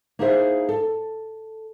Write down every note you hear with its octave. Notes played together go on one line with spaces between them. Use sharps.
A#3 D#4 E4 G#4 C5 E5
A4